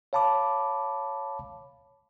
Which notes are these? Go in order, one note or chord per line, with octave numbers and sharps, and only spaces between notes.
C#5 F5 A5 B5 D6